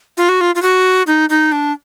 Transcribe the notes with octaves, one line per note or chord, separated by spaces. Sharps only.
F4
F#4
F4
F4
F#4
D#4
D#4
D4